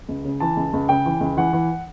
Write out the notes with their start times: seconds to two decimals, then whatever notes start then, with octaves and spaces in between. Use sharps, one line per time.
0.09 C#2
0.25 C#3
0.40 E3 A5
0.57 C#2
0.73 C#2
0.89 C#3 G5
1.06 E3
1.21 C#2
1.37 E3 F#5
1.53 E3